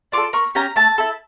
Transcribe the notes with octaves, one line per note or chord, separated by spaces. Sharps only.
D4 F4 A4 D6
A#3 C#6
C#4 G4 A#5
A3 A5
E4 A4